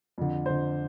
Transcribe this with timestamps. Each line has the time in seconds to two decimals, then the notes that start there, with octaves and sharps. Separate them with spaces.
0.18 F2 D3
0.46 F2 D3 C5